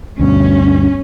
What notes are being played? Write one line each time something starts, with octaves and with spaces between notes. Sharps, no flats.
D2 G2 B2 C#4